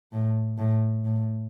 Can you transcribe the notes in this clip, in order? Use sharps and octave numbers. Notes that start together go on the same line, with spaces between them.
A2
A2
A2